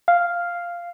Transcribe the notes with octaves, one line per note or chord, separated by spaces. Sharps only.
F5